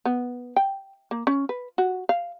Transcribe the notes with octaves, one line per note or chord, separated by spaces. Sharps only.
B3
G5
A#3
C#4
B4
F#4
F5